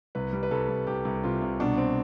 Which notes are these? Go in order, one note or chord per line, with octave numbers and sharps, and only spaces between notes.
C2 B4
G3
B4
C2 A4
C2
C2 G4
C2
C3 F4
C2
B2 D4
C4